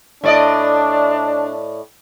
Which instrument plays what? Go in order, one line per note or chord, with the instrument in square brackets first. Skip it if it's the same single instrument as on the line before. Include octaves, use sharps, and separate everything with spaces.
[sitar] A2 D5 D#5 [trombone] D4